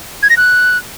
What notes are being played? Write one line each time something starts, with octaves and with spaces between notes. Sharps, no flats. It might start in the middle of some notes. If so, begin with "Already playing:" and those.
G#6
A#6
F#6